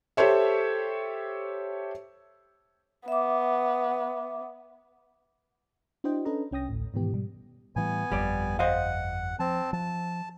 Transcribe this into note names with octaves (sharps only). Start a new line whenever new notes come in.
G4 A4 C5 C#5 E5
B3 E5 D6
D4 E4 F#4 C5 D#5 G5
C#4 D4 A4 B4 D#5 A#5
C2 C#4 G5 D#6 A#6
A1 D2 A2
G#2 B2 D#3 E3 B3 G4
G#2 B2 G3
A2 E3 G3 B3 G#5
G1 F2 G3 D5
C5 D#5 F5 F#5
F3 C4 A5
F3 A5